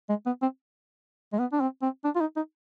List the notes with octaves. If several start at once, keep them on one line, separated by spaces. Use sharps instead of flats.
G#3
B3
C4
G#3
B3
D4
C4
C4
D4
F4
D#4
D#4